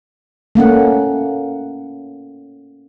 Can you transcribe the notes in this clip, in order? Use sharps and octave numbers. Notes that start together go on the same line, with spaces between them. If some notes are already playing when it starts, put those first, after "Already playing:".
A3 A#3 C#4 F#5